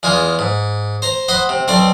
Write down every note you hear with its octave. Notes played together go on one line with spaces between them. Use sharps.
E2 G#3 F4 G#5
G#2
C5 A#5
C5 D#5 F#5 B5 C6
C3
B1 C4 C5 D5 C6